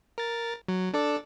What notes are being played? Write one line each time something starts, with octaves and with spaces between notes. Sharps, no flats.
A#4 A6
F#3
D4 A4 D5